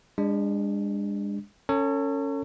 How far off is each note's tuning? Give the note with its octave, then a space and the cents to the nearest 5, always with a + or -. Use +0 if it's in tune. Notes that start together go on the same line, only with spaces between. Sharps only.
G#3 -35 D4 +0
C#4 +0 A4 +40 C#5 +0